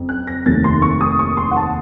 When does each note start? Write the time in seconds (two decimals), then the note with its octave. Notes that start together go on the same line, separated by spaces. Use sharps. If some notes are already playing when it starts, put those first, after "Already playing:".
Already playing: F#1 F2
0.09 F#6
0.27 A#6
0.46 F1 D#2 D#3 A3 A6
0.64 C6
0.82 C#6
1.01 D#6
1.19 C#6
1.37 C6
1.51 F#5
1.57 A5